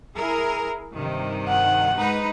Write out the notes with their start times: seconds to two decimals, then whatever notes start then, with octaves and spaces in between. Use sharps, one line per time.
0.17 E4 G#4 A#4
0.92 G2 C3 D#3
1.49 F#5
1.95 G#2 D#4 B4